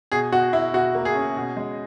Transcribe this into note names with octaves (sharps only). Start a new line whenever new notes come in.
B2 G#4
B2 F#4
B2 E4
B2 F#4
A#3
G#4
C#4
B2
G#3